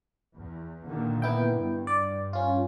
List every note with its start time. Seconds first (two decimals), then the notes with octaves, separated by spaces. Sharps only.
0.34 E2
0.87 A#2 D3 D#3
1.22 B3 E4 G5
1.53 G2
1.87 D5
2.33 C#4 F4